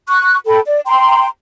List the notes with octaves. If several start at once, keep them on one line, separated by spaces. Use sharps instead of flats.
C#6 F#6
A4 G5 B5
D5
G5 A#5 C6